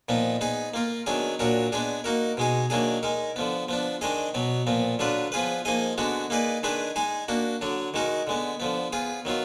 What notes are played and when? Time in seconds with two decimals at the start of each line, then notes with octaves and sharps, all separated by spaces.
0.09 A#2 F3 B3 D#4
0.41 B3 D#4 G#4
0.74 A#3 F4 A#4
1.06 D#3 F#3 B3 D4 G#4
1.39 A#2 F#3 D4 F#4 A#4
1.72 G#3 B3 D4 G#4
2.04 A#3 D#4 F#4 A#4
2.37 B2 G#3 D#4 G#4
2.70 D#3 F#3 A#3 D4 G#4
3.03 G#3 D#4 A#4
3.36 D3 F3 B3
3.69 F3 B3 D4
4.01 D#3 G#3 D4 G#4 D#5
4.34 B2 F#3 B3
4.67 A#2 F3 B3
4.99 D3 F#3 D4 F4 B4
5.32 F3 B3 F4 G#4 B4
5.65 F3 A#3 D#4 G#4 D#5
5.98 D3 G#3 B3 D4 F#4
6.30 A#3 D#4 G#4 B4 D5
6.63 D#3 G#3 D4 G#4 B4
6.96 G#3 D#4 G#4
7.28 A#3 D4 F#4
7.61 D3 F#3 D4
7.94 D#3 G#3 D#4 F#4 A#4
8.27 D3 G#3 B3
8.60 D3 F3 B3
8.92 B3 F4 G#4
9.25 D#3 F#3 B3 F4